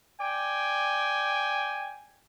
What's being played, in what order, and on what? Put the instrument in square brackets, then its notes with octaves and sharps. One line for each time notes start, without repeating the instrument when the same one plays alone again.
[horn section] D5 G5 G#5